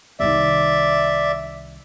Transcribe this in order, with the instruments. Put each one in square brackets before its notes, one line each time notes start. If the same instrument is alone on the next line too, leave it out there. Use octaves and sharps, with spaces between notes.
[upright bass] C2 D#3 [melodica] D5 E5